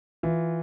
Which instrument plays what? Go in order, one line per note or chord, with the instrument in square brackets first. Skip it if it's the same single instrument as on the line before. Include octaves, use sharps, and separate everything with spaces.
[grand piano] E3 F4